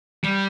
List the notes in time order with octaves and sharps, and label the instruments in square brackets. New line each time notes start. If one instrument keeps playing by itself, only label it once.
[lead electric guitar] G3